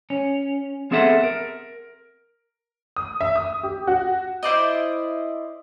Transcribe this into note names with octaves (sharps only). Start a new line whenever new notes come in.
C#4
B3 C4 G#4 A4 E5 F#5
A#4
D#6
E5
D#6
G4
F#4
E4 C5 D5 D#5